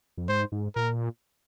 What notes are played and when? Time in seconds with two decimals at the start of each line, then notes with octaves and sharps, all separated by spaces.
0.17 F2
0.29 G#2 C5
0.52 G#2
0.76 A#2 A#4